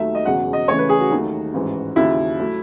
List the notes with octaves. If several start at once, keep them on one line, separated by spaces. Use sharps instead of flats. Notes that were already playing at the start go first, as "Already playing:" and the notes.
Already playing: D#2 D#3 F#3 A3 E5
D#5
E1 E2 C#3 F#3 F#5
D#5
C#2 C#3 E3 A3 C#5
B4
G#4
F#4
D#2 D#3 F#3 A3
A1 G#2 E3
D#2 C#3 F#3 E4
F#3 A3